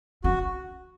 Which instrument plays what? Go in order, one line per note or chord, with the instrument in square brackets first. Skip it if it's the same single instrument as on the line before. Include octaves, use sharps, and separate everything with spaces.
[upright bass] C#4 [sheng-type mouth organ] F#4